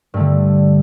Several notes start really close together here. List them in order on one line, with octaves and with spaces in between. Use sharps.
G2 A3 D3